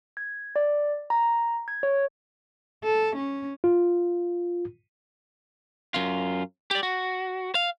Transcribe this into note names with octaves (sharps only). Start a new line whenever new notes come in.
G#6
D5
A#5
G#6
C#5
A4
C#4
F4
F#2 F4
G4 D5
F#4
F5